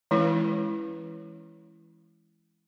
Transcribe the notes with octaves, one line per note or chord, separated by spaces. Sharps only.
E3 G#3 C#4 E4 B4